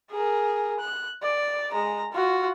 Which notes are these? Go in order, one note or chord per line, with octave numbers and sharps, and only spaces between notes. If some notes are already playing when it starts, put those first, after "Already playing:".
G#4 A#4
F#6
D5
G#3 A#5
F4 F#4